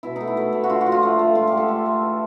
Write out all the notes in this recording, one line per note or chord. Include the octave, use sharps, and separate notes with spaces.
B2 E4
A3 D#4
E4
A3
A3
F#4
D3 F4
F#4
F3
F4
A3
A3
G#3 F4
D3 G4
A4
A3
A3
E3